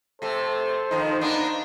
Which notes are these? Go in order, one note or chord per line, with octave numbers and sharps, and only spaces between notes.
C3 A3 A4 C5
F2 D#3 F3 D#4
A#3 B3 D4